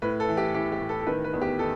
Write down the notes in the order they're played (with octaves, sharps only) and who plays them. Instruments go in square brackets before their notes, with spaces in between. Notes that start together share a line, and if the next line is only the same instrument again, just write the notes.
[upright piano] A2 B4
A4
E3
G4
E3 G4
G4
A2
A4
A4
D#3 B4
B4
E2
G4
D#3 A4